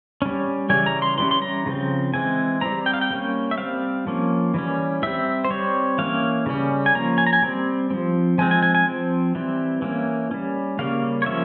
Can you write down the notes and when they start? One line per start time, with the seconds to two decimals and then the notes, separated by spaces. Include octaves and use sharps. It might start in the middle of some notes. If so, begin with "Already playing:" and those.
0.22 G3 C#4
0.69 C#3 E3 G3 C#4 G#5
0.86 A#5
1.02 C6
1.18 E3 G3 C#4 C6
1.31 C6
1.42 A#5
1.66 C#3 F3 C4
2.14 E3 G#3 C4 G#5
2.61 G3 C4 A#5
2.86 G5
2.94 F5
3.01 G5
3.10 G3 A#3 C#4
3.51 E5
3.58 G3 C4 F5
4.07 F3 A#3 C#4
4.54 E3 G3 C#4
5.03 G3 C4 E5
5.45 C5
5.51 G3 C4 C#5
5.98 E3 A#3 C#4 F5
6.46 C#3 G3 C#4
6.86 G#5
6.95 F3 A#3 C#4 A#5
7.18 G#5
7.27 A#5
7.33 G#5
7.42 G3 C4
7.90 F3 C4
8.38 F3 G#3 C4 G#5
8.51 G#5
8.63 G#5
8.75 G#5
8.86 F3 C4
9.35 E3 G3 C4
9.82 E3 A#3 C#4
10.31 G3 C#4
10.79 C#3 G3 A#3 C#4 F5
11.22 C#5
11.26 F3 A#3 C#4 E5